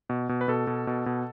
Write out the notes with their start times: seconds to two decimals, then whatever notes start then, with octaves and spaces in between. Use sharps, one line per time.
0.09 B2
0.29 B2
0.41 B4
0.48 B2 A4
0.67 B2
0.87 B2
1.06 B2